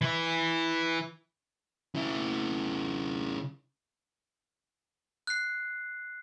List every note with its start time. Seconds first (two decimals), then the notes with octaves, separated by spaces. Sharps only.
0.02 E3 E4
1.95 C#3 E4
5.27 F#6 C7